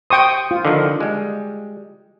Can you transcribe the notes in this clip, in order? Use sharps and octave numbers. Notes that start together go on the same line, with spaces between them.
C5 G5 C#6 D#6
F4
D3 D#3 F3
G3 G#3